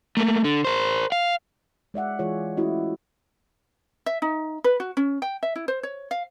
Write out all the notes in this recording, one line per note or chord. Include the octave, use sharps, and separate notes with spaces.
A3 A#3
D3
A#4 C5
F5
G#3 D5 E5 F#5
E3 G#3 F4 G#4 C#5
A3 C#4 E4 F#4 D#5
E5
D#4
B4
F#4
C#4
G5
E5
E4
C5
C#5
F5